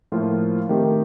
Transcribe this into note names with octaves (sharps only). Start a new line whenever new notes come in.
A2 F3 A#3 F4 C5
D#3 A3 C4 G4